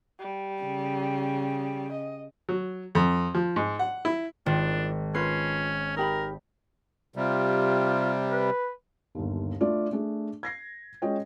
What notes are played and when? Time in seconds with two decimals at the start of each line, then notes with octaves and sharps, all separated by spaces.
0.19 G3
0.62 C#3
1.92 D#5
2.49 F#3
2.95 F2
3.35 F3
3.56 G#2
3.79 F#5
4.05 E4
4.46 G#1 D4 F4
5.15 C#4 F4 B4 C7
5.97 D#4 G4 A#4 B5
7.16 C3 G3 F4
8.30 B4
9.15 G1 D#2
9.61 A3 D4 F4 D5
9.93 A3 D4 G#4
10.43 G#6 A#6 C7
11.02 G#3 C#4 F4 C#5 D#5 G5